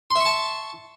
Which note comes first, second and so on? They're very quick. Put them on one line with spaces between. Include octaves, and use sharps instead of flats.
C6 E5 C#6 A5